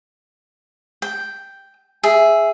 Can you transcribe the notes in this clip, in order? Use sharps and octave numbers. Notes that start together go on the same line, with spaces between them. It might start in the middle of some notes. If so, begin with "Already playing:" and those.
G5
G#4 E5